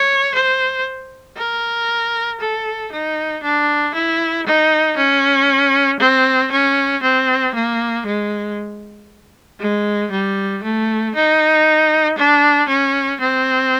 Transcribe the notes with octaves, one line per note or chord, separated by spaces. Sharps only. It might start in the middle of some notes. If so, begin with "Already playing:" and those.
Already playing: C#5
C5
A#4
A4
D#4
D4
E4
D#4
C#4
C4
C#4
C4
A#3
G#3
G#3
G3
A3
D#4
D4
C#4
C4